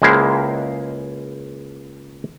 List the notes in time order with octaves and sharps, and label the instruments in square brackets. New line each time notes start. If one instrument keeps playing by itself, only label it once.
[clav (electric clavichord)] C#2 G#3 A#3 E4 C5